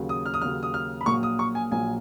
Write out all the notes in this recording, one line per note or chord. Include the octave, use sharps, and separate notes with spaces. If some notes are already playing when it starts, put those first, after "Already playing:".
Already playing: D#2 C#3 F#3
D#6
F6
D#6
D#2 C#3 F#3 F6
D#6
F6
B5
A#1 A#2 F#3 A#3 C#6
D#6
C#6
G#5
A#1 A#2 F#3 A#3 G#5